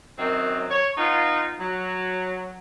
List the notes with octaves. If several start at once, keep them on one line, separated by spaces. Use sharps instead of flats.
F#2 D#3 F#3 C4
C#5
B3 D#4 F4
F#3